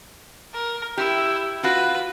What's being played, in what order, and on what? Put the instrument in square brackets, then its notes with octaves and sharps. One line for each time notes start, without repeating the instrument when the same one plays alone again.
[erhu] A#4
[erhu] E4 [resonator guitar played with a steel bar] G4
[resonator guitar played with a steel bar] F4 F#4 [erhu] B4